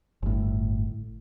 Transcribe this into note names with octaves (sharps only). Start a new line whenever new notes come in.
G1 A2